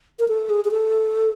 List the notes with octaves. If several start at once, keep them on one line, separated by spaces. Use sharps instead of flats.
A#4
A4
G#4
G#4
A4